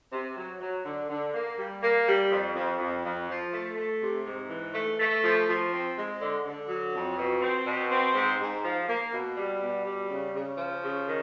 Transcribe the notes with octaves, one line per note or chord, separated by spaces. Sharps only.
C3
F#3
F#3
D3
D3
A#3
G3
A#3
G3
F2
F2
F2
F2
F3
A3
A3
C3
G#2
E3
A3
A3
F3
F3
C4
G#3
D3
D3
F#3
F2
B2
C4
B2
C4
G#2
G#2
F3
A#3
B2
G3
B2
G3
C#3
C#3
F3
C#3
D#3